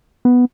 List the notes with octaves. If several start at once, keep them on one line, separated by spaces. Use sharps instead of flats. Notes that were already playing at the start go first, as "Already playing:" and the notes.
B3